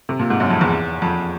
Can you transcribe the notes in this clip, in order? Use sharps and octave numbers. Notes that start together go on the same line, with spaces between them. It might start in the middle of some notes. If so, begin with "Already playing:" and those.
C3
A#2
G#2
F#2
F2
E2
F2